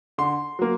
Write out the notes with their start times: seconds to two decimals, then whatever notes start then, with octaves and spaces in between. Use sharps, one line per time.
0.18 D3 C6
0.59 F#3 A#3